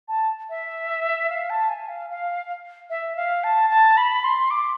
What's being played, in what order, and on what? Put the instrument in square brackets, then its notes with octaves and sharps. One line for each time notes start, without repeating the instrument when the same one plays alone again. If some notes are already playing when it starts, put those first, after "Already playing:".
[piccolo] A5
E5
F5
A5
G#5
F5
F5
E5
F5
A5
A5
B5
C6
D6